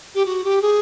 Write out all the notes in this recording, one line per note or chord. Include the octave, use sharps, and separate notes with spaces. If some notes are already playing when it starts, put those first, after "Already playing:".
G4
F#4
G4
G#4